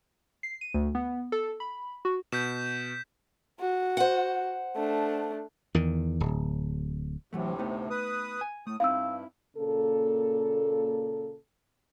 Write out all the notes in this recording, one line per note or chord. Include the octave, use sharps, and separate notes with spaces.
C7
D#7
D2
B3
A4
B5
F#4
B2 G6 B6 E7
F#4
C5 F#5
A3 D4
E2 D#3
D1
D2 A2 C3 E3 F#3 A3
A3 B3 D#4
B4 D#6
G#5
A2 A3 D#6
G2 C4 D#4 E4 F5 E6
A#2 C#3 A#3 A4